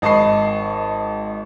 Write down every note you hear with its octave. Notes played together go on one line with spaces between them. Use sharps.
G#1 D#5 A5 B5 C#6 C7